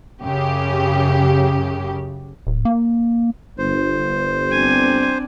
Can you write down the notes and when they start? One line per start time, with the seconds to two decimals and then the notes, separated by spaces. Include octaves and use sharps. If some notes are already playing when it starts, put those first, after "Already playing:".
0.23 F#2 C#3 G4
2.47 D1
2.65 A#3
3.59 G1 C5
4.51 C4 D4 G#5